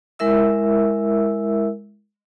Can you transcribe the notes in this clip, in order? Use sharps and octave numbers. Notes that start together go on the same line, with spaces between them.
G#3 E4 A#4 E5 E6